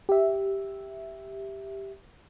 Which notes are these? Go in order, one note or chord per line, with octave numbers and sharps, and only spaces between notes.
G4 E5